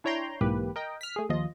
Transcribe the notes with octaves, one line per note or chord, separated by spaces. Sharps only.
D4 E4 C#5 G5 A#5 C6
B1 G#2 E3 A#3 G4 B4
A#4 D#5 G5
F6 B6
A3 G#4
D#2 F3 F4 D#5